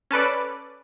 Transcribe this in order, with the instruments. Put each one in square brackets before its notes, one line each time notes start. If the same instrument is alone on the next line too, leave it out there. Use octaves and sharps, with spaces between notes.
[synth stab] C#4 A4 B4 D5